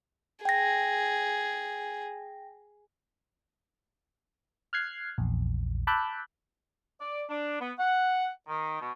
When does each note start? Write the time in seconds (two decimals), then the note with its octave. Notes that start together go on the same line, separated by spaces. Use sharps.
0.45 G#4 G5 A#6
4.73 F6 F#6 G#6 C7
5.18 A#1 E2
5.87 A5 B5 D6 E6 F#6 G6
7.00 D5
7.30 D4
7.61 B3
7.78 F#5
8.48 D#3
8.81 B2